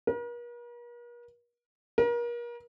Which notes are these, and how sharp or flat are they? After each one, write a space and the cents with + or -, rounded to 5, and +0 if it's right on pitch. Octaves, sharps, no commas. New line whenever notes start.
A#4 +45
A#4 +35